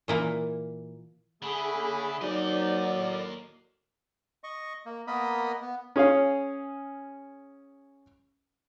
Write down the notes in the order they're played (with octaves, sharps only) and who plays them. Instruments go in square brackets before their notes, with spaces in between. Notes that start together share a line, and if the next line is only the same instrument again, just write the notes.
[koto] A#2 E3 A#3
[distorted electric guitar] D3 [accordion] A3 G#4 B5
[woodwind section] C#3 A#3
[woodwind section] F3 C4 D#4 [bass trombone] F#3 [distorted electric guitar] A#3 D#5 [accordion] D5
[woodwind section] A2
[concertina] D#5 C#6
A#3
A#3 B3 A#4 D#5 B5 D#6
B3
[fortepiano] C#4 G#4 C#5 F5